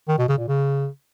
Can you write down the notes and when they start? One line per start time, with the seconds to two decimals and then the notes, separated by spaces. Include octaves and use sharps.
0.08 D#3
0.18 B2
0.28 C#3
0.38 A#2
0.48 C#3